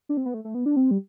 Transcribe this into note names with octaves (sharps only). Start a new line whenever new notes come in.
D4
C4
B3
A3
A3
B3
D4
C4
G3